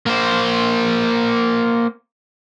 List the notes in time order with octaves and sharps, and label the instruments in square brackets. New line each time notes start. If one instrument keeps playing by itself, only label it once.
[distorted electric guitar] A#3 C5